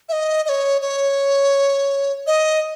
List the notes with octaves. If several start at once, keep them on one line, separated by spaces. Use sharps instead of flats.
E5
D#5
D#5
C#5
C#5
D#5